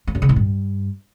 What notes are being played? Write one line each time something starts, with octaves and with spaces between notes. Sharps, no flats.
A#3
F#2
C#3
A2
G2